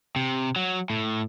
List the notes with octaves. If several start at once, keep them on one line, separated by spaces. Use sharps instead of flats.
C3
F#3
A2